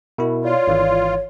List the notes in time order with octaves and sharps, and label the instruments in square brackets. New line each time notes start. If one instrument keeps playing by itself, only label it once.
[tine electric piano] B2 E4 [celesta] A#4 E5
[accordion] F4 [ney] C#5 [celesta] D5
[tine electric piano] G#1 E3